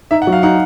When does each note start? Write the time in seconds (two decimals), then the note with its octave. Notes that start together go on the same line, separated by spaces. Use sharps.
0.11 D#4 E5
0.22 F#5
0.27 F#3
0.33 F5
0.43 D#4 F#5